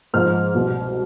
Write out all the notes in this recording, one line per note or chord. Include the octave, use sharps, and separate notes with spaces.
G#2 F3 F6
C2 B2